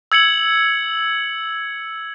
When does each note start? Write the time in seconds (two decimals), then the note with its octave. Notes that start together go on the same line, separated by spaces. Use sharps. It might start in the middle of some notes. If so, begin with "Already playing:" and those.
0.12 E6 G#6 C#7 F#7